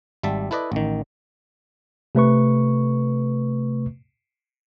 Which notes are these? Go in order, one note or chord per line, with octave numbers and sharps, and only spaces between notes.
G#1 G3 E5 A5
E4 A4 B4 D5 D#5
A1 D#3
C3 A3 B4 C#6